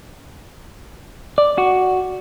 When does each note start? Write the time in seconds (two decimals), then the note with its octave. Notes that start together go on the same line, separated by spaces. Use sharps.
1.38 D5
1.58 F#4